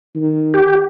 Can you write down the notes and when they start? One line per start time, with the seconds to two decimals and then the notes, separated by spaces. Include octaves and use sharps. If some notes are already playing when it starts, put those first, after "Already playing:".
0.16 D#3
0.54 G4